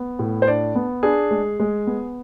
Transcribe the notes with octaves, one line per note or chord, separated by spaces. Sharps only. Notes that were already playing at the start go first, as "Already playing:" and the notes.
Already playing: B3
A2
C5
D4 D5
B3
D4 G#4
G#3
G#3
B3